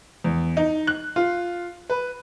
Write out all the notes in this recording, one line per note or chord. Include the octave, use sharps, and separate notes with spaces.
E2
D#4
F#6
F4
B4